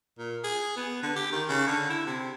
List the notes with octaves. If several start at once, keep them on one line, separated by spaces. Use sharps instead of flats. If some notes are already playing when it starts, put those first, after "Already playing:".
A#2
G#4
B3
D3
G4
D#3
C#3
D3
E4
C3